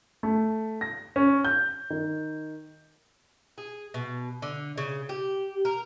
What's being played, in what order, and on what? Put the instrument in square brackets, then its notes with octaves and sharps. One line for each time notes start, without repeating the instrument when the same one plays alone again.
[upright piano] A3
A#6
C#4
G6
D#3
[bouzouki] G#4
B2
D3
C#3
G4
A#4